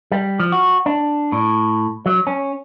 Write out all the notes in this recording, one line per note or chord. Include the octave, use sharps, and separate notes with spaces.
G3
F3
F#4
D4
A2
F#3
C#4